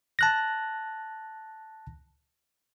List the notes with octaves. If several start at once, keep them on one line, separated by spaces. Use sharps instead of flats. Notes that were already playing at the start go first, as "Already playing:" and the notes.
A5 F#6 A#6